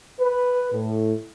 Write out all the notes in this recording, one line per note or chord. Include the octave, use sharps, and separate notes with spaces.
B4
A2